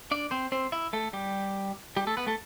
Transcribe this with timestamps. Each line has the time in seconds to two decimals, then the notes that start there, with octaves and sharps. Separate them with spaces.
0.11 D4 D5
0.31 C4 C5
0.52 C4 C5
0.72 E4 E5
0.93 A3 A4
1.13 G3 G4
1.97 G3 G4
2.07 A3 A4
2.17 B3 B4
2.27 A3 A4